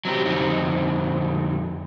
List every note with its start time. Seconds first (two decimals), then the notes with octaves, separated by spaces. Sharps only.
0.05 F#3 C4 D4 G4
0.26 F2 D3 C4 D#4